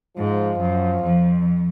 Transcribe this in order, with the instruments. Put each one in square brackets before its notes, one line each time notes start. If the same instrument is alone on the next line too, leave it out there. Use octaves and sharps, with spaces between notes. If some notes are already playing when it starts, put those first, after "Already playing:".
[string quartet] G#2 [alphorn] F3
[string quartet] F#2
F2